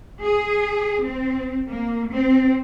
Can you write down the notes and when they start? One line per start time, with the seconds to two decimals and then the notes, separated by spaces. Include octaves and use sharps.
0.23 G#4
1.03 C4
1.69 A#3
2.12 C4